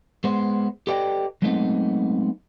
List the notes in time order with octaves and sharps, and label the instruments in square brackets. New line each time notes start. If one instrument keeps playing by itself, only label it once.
[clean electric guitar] G#3 B3 C5
G4 A4 B4 D5 D#5 G5
F#3 G#3 A3 B3 C4 D#4